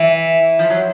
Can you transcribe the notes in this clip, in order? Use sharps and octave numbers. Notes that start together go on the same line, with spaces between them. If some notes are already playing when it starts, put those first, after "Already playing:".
Already playing: E3
F3
F#3